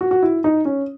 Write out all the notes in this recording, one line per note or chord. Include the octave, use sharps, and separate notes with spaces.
F#4
F#4
E4
D#4
C#4